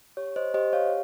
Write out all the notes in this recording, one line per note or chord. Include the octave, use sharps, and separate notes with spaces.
G4 C#5
C5 D#5
G4 C5 D#5
C#5 F5